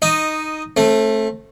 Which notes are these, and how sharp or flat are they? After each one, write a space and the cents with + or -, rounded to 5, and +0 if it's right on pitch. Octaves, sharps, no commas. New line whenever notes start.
D#4 +0 D#5 -10
A3 +0 C4 +40